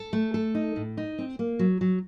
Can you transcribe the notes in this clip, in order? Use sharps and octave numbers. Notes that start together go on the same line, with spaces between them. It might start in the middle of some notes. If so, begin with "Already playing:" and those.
Already playing: A4
A3
A4
D#4
A2
D#4
C4
A#3
F#3
F#3